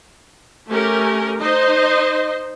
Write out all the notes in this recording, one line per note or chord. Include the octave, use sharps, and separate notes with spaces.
A3 C#4 G4 A#4
D#4 C5 D#5